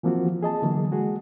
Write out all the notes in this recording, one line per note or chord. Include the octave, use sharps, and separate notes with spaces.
E3 F3 A#3 C4 F4 F#4
G#4 D#5 A5
D3 E3 F#3 A#3
G#3 F#4 G#4